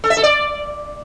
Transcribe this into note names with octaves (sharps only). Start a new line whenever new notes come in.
A4
E5
A4
D5